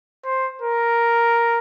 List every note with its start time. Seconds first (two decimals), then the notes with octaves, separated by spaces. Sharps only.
0.25 C5
0.62 A#4